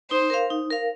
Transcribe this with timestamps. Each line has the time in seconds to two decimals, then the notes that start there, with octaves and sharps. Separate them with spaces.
0.10 D#4 C5
0.30 A#4 F5
0.50 D#4
0.70 A#4 F5